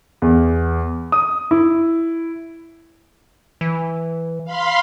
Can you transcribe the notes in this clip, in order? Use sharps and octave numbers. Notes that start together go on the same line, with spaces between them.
E2
D#6
E4
E3
F5 B5 C6